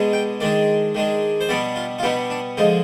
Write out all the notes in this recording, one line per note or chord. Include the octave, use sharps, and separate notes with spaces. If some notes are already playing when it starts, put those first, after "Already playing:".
Already playing: B2 G#3 D4
G5
D#3 G#3 D4 D5
D#3 G#3 D4
C5
B2 G3 B3 D4 D5
F4
F4
B2 G3 B3 D4 D#4
D4
D3 F3 G#3 D#4